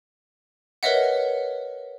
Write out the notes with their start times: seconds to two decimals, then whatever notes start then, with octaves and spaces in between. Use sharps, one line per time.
0.83 A#4 B4 C#5 D#5 E5 F#5